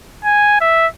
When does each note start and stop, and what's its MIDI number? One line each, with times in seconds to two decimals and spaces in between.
0.25 0.59 80
0.61 0.87 76